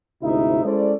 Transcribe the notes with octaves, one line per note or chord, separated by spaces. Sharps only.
D2 G#2 C3 D#4 E4 E5
G#3 C#4 E4 A4 C5 D5